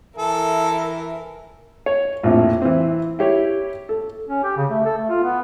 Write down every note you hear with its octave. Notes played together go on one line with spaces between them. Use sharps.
E3 A4 A#4 E5
C#5
A#1 F2 A2
E3 C4
E4 G4 C#5
A4
C#4
G4
C#3
A3
A4
A3
F4
B3